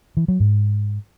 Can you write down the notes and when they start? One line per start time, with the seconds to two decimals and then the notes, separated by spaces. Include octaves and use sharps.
0.17 E3
0.28 F#3
0.40 G#2